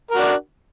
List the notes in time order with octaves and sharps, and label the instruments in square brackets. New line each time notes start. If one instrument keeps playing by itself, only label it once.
[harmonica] A#4
F#4
D4